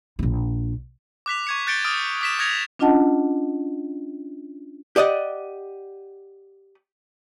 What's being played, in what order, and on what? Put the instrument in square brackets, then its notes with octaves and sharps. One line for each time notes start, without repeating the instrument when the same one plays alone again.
[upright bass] A#1 F4
[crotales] D6 F#6 B6 F7
C#6 G#6 C#7
F#6 G6 A6 C#7 D7 G7
D6 D#6 F6 G#6 D7
D6 B6 E7
D#6 F#6 G#6 A#6 C#7 F7
[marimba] C#4 D4 F4 D#5 F#5 A5
[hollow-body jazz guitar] G4 D5 D#5 F#5